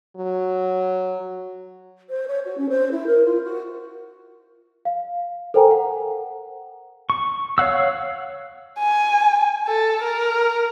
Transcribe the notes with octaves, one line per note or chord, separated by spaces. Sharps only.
F#3
C5
C#5
F#4
C#4
C5
E4
A#4
F4
F#4
F5
A4 A#4 C5 G5 G#5 A#5
F#5
C#6
C#5 F5 F#5 E6
G#5
A4
A#4